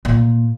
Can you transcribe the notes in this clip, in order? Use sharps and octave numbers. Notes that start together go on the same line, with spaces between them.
A#2